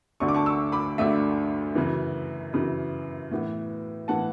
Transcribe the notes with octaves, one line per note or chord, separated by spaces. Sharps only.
D2 D3 A3 D4 C#6
D6
A5 C#6
C#6 E6
B5 D6
D2 D3 A3 D4 E5
F#2 C#3 E3
F#2 C#3 E3
A2 E3 B3
A2 E3 B3 F#5 A5